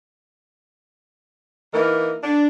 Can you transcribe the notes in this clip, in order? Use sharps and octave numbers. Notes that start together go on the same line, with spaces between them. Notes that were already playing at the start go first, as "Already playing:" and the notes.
E3 A#3 D#4 E4 A#4
D4